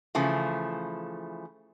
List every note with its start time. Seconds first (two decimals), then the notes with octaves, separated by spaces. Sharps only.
0.15 C#3 E3 F3 A3